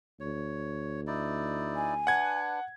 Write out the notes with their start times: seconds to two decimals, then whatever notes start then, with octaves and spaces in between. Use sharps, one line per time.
0.20 D2 C#5
1.07 D#4 E4 D5
1.76 G#5
2.07 D4 B4 F#5 G#6